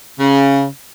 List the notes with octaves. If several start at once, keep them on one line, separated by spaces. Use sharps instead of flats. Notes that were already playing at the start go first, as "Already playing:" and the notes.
C#3